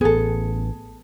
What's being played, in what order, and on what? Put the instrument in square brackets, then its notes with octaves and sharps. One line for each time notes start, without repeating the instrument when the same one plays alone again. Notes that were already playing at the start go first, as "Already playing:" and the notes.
[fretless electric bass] A1 B3 [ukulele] G#4 A4